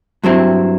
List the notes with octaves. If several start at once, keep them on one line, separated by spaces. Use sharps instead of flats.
G2 F#3 C4 E4